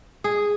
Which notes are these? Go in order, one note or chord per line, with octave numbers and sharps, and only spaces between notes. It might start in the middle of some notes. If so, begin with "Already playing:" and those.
G#4